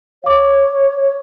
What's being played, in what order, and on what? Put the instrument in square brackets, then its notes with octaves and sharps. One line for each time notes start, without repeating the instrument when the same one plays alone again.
[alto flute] C#5 [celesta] F5 D6